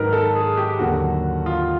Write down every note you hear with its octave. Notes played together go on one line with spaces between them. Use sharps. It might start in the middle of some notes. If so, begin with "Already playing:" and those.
Already playing: G#2 D#3 F#3 A#4 B4
A4
G#4
G4
D#2 D3 F#3 F#4
F4